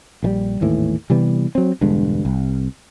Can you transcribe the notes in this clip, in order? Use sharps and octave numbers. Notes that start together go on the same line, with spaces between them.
A#1 D#3 G3
G#1 D#2 A2 E3
C3 E3 G3 B3
F#3 C4
E1 G2 D3 G#3
C2